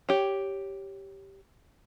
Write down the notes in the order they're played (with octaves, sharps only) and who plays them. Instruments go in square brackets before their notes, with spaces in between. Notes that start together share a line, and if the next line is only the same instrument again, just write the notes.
[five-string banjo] G4 C#5